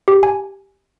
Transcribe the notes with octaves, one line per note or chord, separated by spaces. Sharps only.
G4
G#5